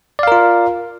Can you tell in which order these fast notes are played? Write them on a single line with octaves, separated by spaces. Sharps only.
D5 F5 A#4 F4